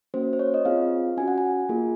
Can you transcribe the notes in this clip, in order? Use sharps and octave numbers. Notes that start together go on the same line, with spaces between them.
A#3 C#4 F#4 C5
C5
C#5
D#5
C4 F4 G#4 F5
C#4 F#4 G#5
F#5
G#5
A#3 F4 G#4